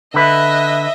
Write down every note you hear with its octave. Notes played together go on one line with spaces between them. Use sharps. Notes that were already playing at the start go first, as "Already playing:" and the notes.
D3 B4 D#5 E5